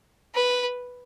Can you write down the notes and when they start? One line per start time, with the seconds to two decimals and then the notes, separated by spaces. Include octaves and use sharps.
0.35 B4